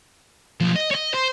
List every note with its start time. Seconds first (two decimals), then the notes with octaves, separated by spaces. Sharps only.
0.61 B1 F3
0.76 D#5
0.91 C#5 D#5
1.14 C5